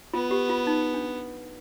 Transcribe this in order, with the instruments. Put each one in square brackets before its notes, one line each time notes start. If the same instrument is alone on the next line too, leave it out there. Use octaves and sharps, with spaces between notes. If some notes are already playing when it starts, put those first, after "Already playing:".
[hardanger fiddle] B3 [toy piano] F4
[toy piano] G4
F4
D#4
D4